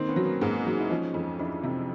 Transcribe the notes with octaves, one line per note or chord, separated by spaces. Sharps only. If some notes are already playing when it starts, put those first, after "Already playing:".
Already playing: D#3 A#3 C4
B3 C#4
F#3
A#3
G#2 A#3
F#3
E4
F3 C#4 D#4
F2
F2 D4 E4
C3